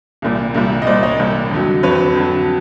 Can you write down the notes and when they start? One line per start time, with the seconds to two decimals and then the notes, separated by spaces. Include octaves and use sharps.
0.22 C2 A#2 G3
0.55 C2 A#2 G3
0.82 D#5
0.87 C2 A#2 G3 C5 D5
1.03 C#5 D#5
1.19 C2 A#2 G3
1.51 F2 D3 F#3
1.83 F2 D3 F#3 B4 C#5
2.16 F2 D3 F#3